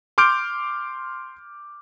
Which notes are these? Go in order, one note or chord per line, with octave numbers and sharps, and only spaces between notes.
C6 D6 F6 G6 D7